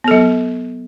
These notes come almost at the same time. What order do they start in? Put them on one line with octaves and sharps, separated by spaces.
B3 A4 F#3